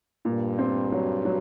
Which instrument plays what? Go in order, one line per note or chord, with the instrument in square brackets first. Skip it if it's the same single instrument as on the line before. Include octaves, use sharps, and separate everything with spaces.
[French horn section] G2 [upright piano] A#2
[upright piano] C4
F#3
F#3